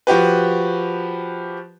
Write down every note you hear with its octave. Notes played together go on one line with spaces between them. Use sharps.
F3 F#4 G4 B4